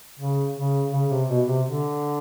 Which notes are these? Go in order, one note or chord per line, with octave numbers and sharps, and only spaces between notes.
C#3
C#3
C#3
C3
B2
C3
D3